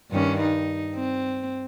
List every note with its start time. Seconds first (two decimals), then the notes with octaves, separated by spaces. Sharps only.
0.11 G2 D#3 C#4
0.40 D#4
0.95 C4